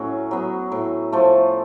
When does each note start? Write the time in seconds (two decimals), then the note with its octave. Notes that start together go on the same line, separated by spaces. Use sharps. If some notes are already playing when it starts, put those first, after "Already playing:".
Already playing: A2 F#3 C#4 F#4
0.31 F#3 B3
0.72 A2
1.13 F3 A3